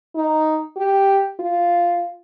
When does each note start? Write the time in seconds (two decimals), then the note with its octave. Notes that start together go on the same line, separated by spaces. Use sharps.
0.15 D#4
0.77 G4
1.40 F4